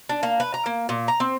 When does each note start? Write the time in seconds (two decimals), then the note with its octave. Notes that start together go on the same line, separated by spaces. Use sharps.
0.09 D4
0.23 A#3
0.40 B4
0.54 A#5
0.66 A#3
0.89 A#2
1.08 A#5
1.20 C4